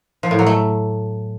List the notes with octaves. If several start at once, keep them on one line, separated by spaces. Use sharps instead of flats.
F3
A2
F#3
A3